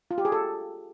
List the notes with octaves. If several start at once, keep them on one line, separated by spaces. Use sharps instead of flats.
F4
G4
G#4
A4